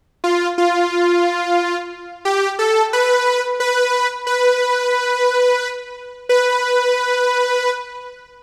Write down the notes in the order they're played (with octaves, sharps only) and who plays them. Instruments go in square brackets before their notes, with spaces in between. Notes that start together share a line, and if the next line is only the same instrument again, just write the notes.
[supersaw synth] F4
F4
G4
A4
B4
B4
B4
B4